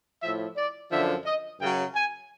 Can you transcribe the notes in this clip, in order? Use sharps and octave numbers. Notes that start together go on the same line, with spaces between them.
A2 F3 E5
D5
F#2 D3 F3 E5
D#5
F#2 C#3 F#3 G5
G#5